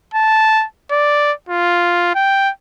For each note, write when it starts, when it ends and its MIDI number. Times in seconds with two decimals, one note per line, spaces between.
0.14 0.65 81
0.91 1.32 74
1.49 2.12 65
2.15 2.50 79